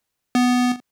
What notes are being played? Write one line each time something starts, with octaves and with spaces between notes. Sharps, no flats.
B3